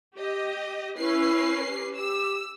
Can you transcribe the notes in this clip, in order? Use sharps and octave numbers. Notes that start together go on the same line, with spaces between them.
G4 D#5
C#4 E4 B4 C7
G4
G4 E6